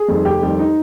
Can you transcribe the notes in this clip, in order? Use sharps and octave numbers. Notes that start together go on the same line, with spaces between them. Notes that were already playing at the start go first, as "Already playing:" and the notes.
Already playing: G#4
F2 D#3 G3
F1 G4
F2 D#3 G3
D#4